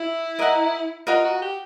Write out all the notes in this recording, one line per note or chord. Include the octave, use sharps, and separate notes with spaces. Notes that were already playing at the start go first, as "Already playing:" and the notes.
Already playing: E4
A#4 D#5 F#5 A#5
F4 A#4 D#5 F#5 A#5
F#4
G4